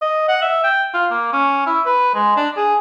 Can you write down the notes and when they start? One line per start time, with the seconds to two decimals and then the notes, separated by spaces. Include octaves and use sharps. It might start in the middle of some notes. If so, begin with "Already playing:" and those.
0.02 D#5
0.28 F#5
0.42 E5
0.64 G5
0.94 F4
1.11 A#3
1.33 C#4
1.66 E4
1.86 B4
2.15 G#3
2.37 D4
2.57 G#4